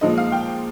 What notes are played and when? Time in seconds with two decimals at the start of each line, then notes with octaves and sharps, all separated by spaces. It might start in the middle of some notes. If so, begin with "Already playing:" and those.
0.01 A#2 F3 G#3 D#5
0.18 F5
0.32 G5